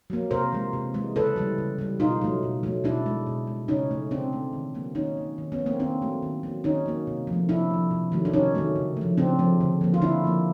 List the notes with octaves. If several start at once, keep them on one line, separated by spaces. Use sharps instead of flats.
F#3 A#3
C3 A#4 C5
E3 G#3
C3
E3 G#3
C#3 A4 B4
E3 G3
C#3
E3 G3
B2 D#4 F4
F#3 A3
B2
F#3 A3
B2 D4 E4
G#3
B2
G#3
C#3 C#4 D#4
E3 A3
C#3 C4 D4
E3 A3
D#3
F#3 A#3
D#3 C#4 D#4
F#3 A#3
D#3
B3 C#4
F#3 A3
A#3 C4
D#3 C4 D4
F#3 A3
D#3
F#3 A#3
D#3 C#4 D#4
F#3 A#3
C3
F3
A3
C3 D4 E4
F3 A3
C3
D#3 F#3 A3
D4
C3 C#4 D#4
D#3 F#3 A3
C#3
F3 A3
C#3 C4 D4
F3 A3
D3
F3 A#3
F4
D3 D4 E4
F3 A#3